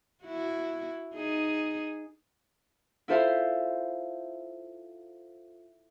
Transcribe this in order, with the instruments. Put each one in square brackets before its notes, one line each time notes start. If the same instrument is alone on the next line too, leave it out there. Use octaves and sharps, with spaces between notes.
[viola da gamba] E4 F#4
D#4 G#4
[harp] E4 F4 A4 C5 F5 C6